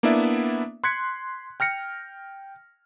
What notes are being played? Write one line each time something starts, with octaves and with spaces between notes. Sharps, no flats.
A#3 B3 D4 E4 D5 E5
C6 F#6 G#6 B6 C#7
G5 F6 A#6 C#7